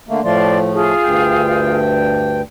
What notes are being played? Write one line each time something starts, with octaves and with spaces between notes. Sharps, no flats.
D3 A3 A#3
A2 F3 A3 D5 F5 C6
F4 G#4
D2 G2 G5